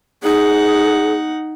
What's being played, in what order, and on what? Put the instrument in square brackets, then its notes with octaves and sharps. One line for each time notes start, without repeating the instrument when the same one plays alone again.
[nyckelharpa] D#4 F#5 [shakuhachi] G#4